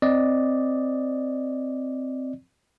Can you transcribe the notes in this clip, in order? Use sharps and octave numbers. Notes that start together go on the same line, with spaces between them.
C4 D5 D#5